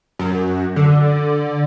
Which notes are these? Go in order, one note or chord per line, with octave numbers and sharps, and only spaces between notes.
F#2
D3